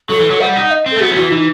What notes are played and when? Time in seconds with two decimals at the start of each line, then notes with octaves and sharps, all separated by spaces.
0.10 F#3 A4
0.20 E3
0.30 F#3
0.40 G3 F#5
0.56 D#4
0.71 D#5
0.86 C4
0.91 A3 A4
1.01 B3 F#4
1.11 F#3
1.16 E3 F#4
1.31 E3 D#4